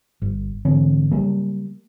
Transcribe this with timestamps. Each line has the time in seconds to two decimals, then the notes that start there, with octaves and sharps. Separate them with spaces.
0.22 G1
0.65 G#1 D3 E3 C4
1.11 C#3 F#3 G3 A#3